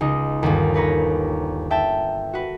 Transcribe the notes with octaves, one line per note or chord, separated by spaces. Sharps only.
C#2 D#4
G1 D#2
A#4 B4 C#5 A#5
E5 G5 A5
F#4 B4